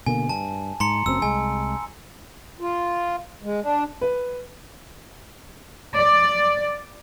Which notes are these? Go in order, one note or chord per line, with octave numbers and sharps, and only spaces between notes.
B2 D3 A#3 G#5
G2 A5
G#2 A#5 C6 C#7
F#1 F#2 C4 E6
C2 G#3 G#5
F4
G#3
D4
B4
D5